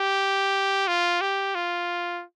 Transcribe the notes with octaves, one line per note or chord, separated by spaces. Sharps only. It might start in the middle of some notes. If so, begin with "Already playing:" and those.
Already playing: G4
F4
G4
F4